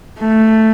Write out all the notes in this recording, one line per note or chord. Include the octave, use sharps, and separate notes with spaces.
A3